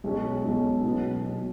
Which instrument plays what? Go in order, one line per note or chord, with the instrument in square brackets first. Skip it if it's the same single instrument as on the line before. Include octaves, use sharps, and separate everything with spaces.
[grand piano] B1 B2 G#3 C#4
B1 B2 G#3 C#4
B2 F#3 B3
B2 F#3 B3